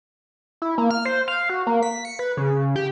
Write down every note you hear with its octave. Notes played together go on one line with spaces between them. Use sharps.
E4
A#3
F6
C5
F5
F#4
A#3
B6
C#7
B4
C#3
G4